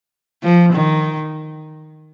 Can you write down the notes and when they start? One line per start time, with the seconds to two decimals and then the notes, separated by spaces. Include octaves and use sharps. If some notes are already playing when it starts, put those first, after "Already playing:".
0.43 F3
0.73 D#3